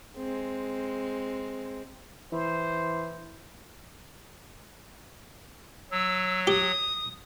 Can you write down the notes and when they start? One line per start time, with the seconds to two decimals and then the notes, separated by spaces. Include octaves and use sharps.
0.16 G#3 C4
2.32 E3 C5
5.91 F#3 E6
6.47 G4 D#6